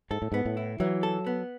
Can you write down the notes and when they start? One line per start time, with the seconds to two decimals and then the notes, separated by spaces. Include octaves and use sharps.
0.11 G#2 A4
0.22 A2
0.32 G#2 B3
0.45 A2
0.57 E4
0.80 E3 F#3
1.03 A4
1.27 B3